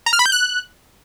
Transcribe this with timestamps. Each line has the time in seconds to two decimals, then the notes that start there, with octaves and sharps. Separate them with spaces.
0.06 A#5
0.13 F6
0.19 B5
0.26 G6
0.32 F#6